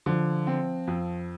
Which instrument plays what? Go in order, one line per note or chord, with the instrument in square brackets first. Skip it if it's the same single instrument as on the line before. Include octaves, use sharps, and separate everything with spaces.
[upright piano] D3 [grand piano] F3
[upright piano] C4
F2